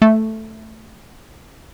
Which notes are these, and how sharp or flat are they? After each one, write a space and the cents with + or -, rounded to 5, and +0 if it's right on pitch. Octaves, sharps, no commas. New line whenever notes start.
A3 +0